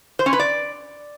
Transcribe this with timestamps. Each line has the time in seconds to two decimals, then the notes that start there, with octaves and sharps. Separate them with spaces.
0.19 C5
0.26 C#4
0.33 B4
0.40 D5